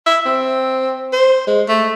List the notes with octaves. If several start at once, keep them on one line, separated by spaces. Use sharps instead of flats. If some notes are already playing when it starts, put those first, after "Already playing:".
E5
C4
C5
G#3
A3